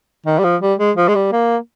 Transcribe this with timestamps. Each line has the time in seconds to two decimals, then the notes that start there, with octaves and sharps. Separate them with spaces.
0.26 D#3
0.38 G3
0.44 F3
0.61 G3
0.79 G#3
0.97 F3
1.08 G#3
1.15 G3
1.32 A#3